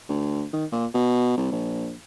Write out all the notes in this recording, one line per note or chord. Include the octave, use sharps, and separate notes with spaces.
D2
D#3
A#2
B2
C2
A#1